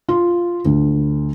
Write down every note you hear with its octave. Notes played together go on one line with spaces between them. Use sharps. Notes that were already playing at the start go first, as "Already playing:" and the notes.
F4
D2